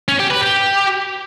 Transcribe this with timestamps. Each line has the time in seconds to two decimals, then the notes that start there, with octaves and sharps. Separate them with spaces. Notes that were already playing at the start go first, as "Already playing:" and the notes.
0.08 C#4
0.19 G4
0.30 B4
0.41 G4